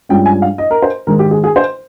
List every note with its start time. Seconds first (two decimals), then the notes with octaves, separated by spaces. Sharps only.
0.09 G2 F3 G#3 C#4 G5
0.26 G#5
0.42 F5
0.58 D#5
0.71 A#4
0.82 C5
1.07 G#2 D#3 G#3 A#4
1.19 G4
1.31 G#4
1.44 G#4
1.56 C5